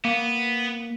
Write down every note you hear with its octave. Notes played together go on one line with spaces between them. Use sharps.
A#3 B3